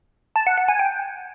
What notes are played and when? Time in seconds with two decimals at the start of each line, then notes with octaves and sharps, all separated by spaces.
0.36 A5
0.47 F#5
0.58 F#5
0.68 G#5
0.79 G5